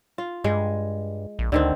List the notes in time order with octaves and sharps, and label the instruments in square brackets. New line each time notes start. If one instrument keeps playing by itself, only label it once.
[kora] F4
[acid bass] G2 [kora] G#3
[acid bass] A#1
[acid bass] D2 [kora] D3 D#3 C4